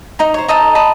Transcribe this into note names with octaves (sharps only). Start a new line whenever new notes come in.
D#4 A#5
C5 C#5
D#4 A4 D#5 A#5
D#5 A5 B5